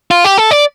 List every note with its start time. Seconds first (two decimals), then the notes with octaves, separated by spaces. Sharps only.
0.11 F4
0.25 G4
0.38 A4
0.51 D5